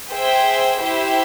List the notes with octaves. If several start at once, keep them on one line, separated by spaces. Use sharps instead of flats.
G#4 C5 E5 G5
E4 G4 C5 E5 G5